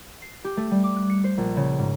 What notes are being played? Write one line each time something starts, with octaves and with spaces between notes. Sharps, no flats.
C7
G4
A3
G3
D6
F#6
C#7
C5
A#1
C#3
G#2